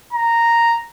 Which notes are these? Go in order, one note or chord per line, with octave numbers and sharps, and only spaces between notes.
A#5